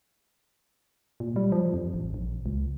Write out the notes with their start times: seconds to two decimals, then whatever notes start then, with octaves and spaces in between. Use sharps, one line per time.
1.20 A#2
1.36 G3
1.52 F3
1.74 F2
1.94 A1
2.14 A#1
2.46 C#2